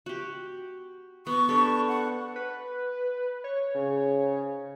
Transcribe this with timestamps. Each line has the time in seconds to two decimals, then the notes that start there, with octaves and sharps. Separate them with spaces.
0.06 F#4 G4
1.27 B3 C#6
1.49 D4 G4 A4
1.88 F#5
2.36 B4
3.44 C#5
3.73 G#2 C#3